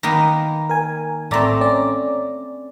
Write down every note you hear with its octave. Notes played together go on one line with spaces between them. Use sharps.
D#3 A#3 B3
A#4 G#5
A1 A3 C4 D5 A#5
C#4 D5